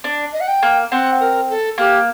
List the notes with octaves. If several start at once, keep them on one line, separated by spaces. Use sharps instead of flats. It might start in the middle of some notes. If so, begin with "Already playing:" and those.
D4
D#5
F#5
G5
A#3
C4 F#5
A#4
A4
A#3 G4